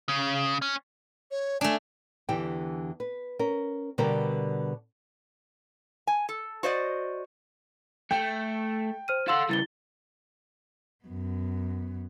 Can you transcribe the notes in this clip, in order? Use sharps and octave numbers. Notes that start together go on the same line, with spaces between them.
C#3
C#4
C#5
A3 D4 G#5
E2 D3 E3 G4 G5
B4
C#4 A#4
B2 D3 G3 B3 G4 A#4
G#5
A4
F#4 C5 D5 D#5
A3 G5
C5 F6 D#7
A4 F5 F#5 C6 E6
C#3 G3 E4 A6 G7
F#2 B3